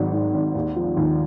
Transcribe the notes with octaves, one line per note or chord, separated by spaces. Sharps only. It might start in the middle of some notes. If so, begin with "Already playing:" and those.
Already playing: G#1 G#2 D#3 F#3
G#2
G#1
D#2
F3
D#2